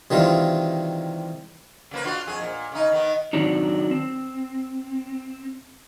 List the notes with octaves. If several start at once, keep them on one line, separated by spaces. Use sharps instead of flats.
C3 D#3 E3 G3 G#3 F4
C#3 A#3 B4
D4 F4 F#4
F2 G#4
A#2
C#3 D#4
D#3 B3
D#3 F#3 C4 D4 D#4
C4